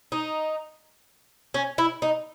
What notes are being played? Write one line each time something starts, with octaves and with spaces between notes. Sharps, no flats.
D#4
C#4
E4
D#4